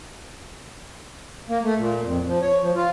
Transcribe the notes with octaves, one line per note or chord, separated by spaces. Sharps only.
A#3
A3
A#2
F2
F3
C#5
F3
F4